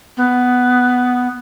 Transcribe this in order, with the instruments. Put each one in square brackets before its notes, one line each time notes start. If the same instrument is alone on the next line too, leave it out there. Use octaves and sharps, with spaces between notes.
[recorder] B3